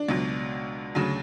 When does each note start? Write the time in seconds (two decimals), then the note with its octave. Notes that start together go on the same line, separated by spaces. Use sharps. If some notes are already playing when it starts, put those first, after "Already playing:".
Already playing: D4
0.09 C#2 B2 F#3
0.95 D2 C#3 F#3